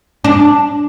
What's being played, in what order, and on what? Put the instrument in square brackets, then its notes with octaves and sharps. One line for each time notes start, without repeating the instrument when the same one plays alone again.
[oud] D4